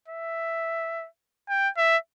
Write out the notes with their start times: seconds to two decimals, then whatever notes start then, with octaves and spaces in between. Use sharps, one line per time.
0.08 E5
1.49 G5
1.77 E5